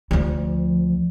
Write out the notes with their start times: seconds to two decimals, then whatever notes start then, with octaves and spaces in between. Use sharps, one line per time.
0.11 D2 F3